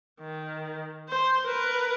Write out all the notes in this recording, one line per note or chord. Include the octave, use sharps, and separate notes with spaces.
D#3
C5
A#4 B4